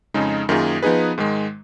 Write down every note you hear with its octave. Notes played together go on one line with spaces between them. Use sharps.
F2 C#3 G#3 D#4
F#2 D#3 A#3 F4 G#4
F3 B3 D#4 G#4 B4
G#2 D#3 G#3